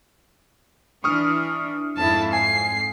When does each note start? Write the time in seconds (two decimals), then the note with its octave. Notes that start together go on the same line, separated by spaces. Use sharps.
1.04 E3 D4 C#6 D#6 F6
1.97 F2 G#2 E4 A5
2.33 G#5 C7